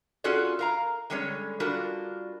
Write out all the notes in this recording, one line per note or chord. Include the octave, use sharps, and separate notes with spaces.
C#4 F4 F#4 G#4 A4 D5
A#4 F5 A#5
D3 G3 G#3 C#4 C#5
G3 D4 F4 F#4 A#4